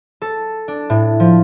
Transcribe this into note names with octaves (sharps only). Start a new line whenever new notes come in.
A4
D4
A2
F3